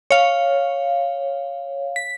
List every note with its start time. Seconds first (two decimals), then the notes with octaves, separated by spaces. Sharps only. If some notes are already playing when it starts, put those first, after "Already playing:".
0.11 C#5 F5
1.96 B6